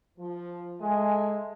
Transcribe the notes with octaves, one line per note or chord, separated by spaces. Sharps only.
F3
G#3 A4 E5 G#5